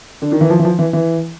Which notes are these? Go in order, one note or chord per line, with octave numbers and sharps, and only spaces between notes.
D3
D#3
E3
F3
E3
F3
E3
E3